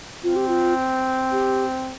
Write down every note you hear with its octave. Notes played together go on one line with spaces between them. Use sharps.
C4 F4
G4
F4
G4